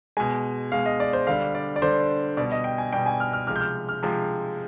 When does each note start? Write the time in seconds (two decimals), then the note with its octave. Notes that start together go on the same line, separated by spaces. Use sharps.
0.17 B2 G#3 G#5
0.72 B2 G#3 F5
0.86 D#5
1.00 D5
1.13 C5
1.27 D3 G3 F5
1.55 D5
1.76 D5
1.82 D3 G3 C5
2.37 B2 G3 D5
2.52 D#5
2.64 G5
2.78 G#5
2.93 B2 G3 G5
3.06 G#5
3.20 F6
3.33 F6
3.47 C3 F3 G#3 F6
3.56 G6
3.61 F6
3.89 F6
4.03 C3 F3 G#3